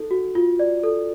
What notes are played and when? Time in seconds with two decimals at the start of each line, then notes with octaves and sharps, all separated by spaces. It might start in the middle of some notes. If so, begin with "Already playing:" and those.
Already playing: D#4 A4
0.11 F#4
0.35 F4
0.59 D5
0.83 A4